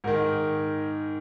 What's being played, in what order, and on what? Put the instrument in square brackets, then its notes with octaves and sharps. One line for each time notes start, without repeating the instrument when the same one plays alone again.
[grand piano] G#2 D#3 A#4